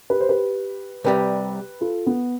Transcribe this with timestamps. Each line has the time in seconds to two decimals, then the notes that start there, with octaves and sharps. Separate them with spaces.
0.10 G4 B4
0.20 C5
0.29 G4 B4
1.04 C2 C3 G3 G4 B4
1.81 F4 A4
2.07 B3